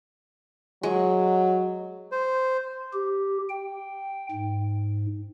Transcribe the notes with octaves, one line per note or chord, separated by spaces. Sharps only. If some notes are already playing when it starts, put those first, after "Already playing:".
F#3 G#3
C5
G4
G5
G#2